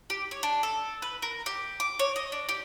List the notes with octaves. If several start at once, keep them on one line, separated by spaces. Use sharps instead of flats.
G4
C#5
D4
A4
B4
A#4
G4
D6
C#5
D#5
D4
G4